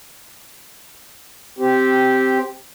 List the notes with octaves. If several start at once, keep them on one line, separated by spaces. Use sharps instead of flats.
C4 G4